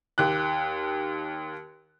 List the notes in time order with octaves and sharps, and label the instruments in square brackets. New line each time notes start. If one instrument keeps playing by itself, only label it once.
[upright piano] D#2 F#6